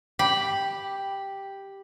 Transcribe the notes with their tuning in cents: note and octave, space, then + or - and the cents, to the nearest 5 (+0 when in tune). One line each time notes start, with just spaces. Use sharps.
G4 +0 B5 +0